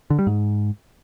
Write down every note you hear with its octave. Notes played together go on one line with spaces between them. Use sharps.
D3
G3
G#2